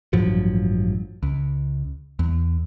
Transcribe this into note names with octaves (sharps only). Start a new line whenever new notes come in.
A1 G2 F3 F#3
C#2
E2